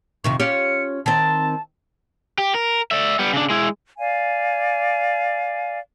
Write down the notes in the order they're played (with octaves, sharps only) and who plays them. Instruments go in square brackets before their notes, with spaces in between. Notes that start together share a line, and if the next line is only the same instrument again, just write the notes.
[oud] F2 C3 D#3 [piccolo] C#6
[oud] C#4 F4 G4 [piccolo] C#7
[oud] D#3 C4 [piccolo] A5
[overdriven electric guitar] G4
A#4
D5 E5
G3 B3
C#3 D4
G#3 E4
[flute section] D5 F5 G#5